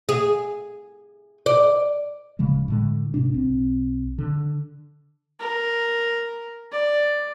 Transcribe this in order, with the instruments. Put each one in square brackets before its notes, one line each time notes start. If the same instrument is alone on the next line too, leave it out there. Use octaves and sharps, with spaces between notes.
[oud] G#4
D5
[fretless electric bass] D1 C#3 F3 G#3
A2 D3 G#3
G#2 C3 D4
B1 C4
D3
[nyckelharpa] A#4
D5